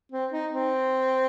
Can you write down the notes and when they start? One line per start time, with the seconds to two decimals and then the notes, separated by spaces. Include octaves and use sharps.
0.12 C4
0.33 D#4
0.53 C4